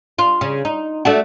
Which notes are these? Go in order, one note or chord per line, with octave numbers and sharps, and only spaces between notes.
F4
C#3
D#4
A3 D4 F#4